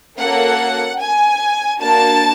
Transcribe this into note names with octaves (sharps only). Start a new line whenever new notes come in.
A#3 C#4 F#4 A4 F#5
G#5
A#3 D4 F#4 A5